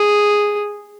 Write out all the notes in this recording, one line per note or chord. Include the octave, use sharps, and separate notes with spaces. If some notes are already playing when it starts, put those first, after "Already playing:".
Already playing: G#4